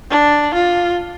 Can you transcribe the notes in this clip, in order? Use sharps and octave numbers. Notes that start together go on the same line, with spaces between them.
D4
F4